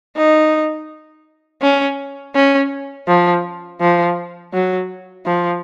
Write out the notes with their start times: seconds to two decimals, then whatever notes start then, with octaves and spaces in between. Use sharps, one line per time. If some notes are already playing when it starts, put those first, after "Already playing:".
0.16 D#4
1.62 C#4
2.35 C#4
3.07 F3
3.80 F3
4.53 F#3
5.26 F3